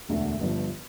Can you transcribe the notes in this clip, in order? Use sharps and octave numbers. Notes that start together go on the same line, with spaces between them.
E1 D2 D3 A3
G1 G2 F3